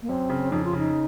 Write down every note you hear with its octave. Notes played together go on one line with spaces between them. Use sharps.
A#3
F#2 C4
C#3
F2 D#4
F4
C#3 D#4